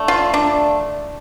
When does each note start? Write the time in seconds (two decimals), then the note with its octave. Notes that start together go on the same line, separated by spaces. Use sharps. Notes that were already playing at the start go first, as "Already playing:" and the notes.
Already playing: D3 A3
0.08 F4
0.34 D4